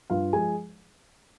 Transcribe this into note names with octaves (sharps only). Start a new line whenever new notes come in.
G2 F4 F5
F3 G#3 G#4 G#5